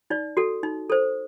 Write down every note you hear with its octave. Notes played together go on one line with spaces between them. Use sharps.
D#4 D5
F#4 A4
D#4
A4 C5